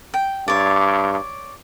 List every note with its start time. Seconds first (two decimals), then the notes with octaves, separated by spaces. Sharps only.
0.14 G5
0.48 G2 C#5 D5